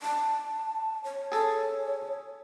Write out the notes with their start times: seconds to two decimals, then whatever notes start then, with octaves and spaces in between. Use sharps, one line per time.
0.02 A5
1.04 C#5
1.32 G#4 A4 C#5